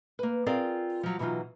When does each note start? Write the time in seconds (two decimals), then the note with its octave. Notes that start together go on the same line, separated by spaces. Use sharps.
0.19 A#3 B4
0.46 C4 F4 G#4 A#4 D5 F5
1.03 F3 F#3
1.19 B2 E3 F#3 D#4 F4